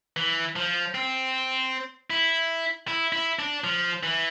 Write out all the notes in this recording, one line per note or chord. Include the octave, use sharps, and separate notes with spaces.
E3
F3
C4
E4
E4
E4
D4
F3
E3